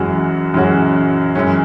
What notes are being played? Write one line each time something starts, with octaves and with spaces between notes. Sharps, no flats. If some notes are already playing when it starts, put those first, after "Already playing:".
Already playing: F#2 E3 G#3 C#4 F#4
F#2 E3 G#3 C#4 F#4
F#2 E3 G#3 C#4